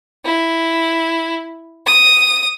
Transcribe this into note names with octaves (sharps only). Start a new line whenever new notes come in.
E4
D#6